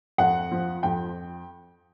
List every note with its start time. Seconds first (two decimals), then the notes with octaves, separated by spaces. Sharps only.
0.18 F2 F#5
0.51 F3
0.83 F2 G5